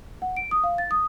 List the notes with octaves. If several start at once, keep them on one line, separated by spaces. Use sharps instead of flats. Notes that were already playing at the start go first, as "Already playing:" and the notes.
F#5
D7
D#6
F5
A6
D#6